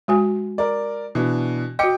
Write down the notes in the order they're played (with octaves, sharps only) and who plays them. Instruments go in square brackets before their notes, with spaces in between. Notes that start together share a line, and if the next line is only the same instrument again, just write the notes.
[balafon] G#3 F#4 G#5
[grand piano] A#4 D5
B2 E3 D4
[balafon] F#4 D#5 [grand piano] G5 D6 C#7